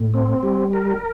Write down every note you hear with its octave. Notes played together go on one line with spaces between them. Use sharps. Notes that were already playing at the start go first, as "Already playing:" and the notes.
Already playing: A2
C4
G3
A#4